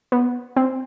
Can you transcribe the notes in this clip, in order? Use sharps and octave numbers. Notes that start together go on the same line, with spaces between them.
B3
C4